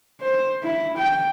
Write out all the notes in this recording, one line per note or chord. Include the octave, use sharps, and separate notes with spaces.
C5
E4
G5